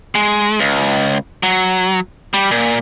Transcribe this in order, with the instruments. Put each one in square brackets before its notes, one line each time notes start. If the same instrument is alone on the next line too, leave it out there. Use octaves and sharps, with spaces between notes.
[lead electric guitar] G#3
C#2
F#3
G3
A#2